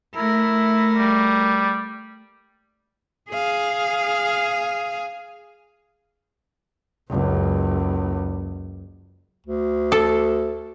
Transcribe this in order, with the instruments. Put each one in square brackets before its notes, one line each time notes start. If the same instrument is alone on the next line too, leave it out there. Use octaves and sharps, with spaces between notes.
[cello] A3 A#4 [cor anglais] E4
[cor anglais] G3
[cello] G#4 F5
[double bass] F#1 C#2
[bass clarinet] D2
[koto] A4